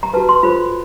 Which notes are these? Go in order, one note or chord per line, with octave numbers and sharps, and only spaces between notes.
A#5
F#4 B4 A5
C6
F4 A4 C5 B5